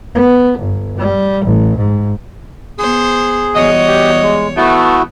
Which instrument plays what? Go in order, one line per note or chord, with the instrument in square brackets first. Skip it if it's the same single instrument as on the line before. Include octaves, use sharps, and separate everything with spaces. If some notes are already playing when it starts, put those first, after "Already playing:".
[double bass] B3
G1
G3
A1
G#2
[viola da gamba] B3 C5 [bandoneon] G#4
[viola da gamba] E2 G3 C#5 [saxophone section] F#4 D#5
[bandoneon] G4
G#3
[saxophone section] A3 B3 [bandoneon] E4 F#4